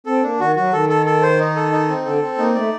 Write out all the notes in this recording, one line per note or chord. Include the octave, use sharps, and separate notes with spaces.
C4 A4
A#3 D4
D#3 F#4
F#3 F#4
D#3 A4
A4
A4
C5
D#4
A4
D#4
C4
D3 A4
C4
A#3 D#4
A3 D5